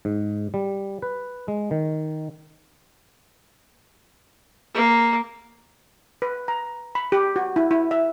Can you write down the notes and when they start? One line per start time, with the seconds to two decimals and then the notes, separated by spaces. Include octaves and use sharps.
0.05 G#2
0.54 G3
1.02 B4
1.48 G#3
1.71 D#3
4.75 A#3
6.22 B4
6.48 A#5
6.95 B5
7.12 G4
7.36 F#4
7.56 E4
7.71 E4
7.91 E5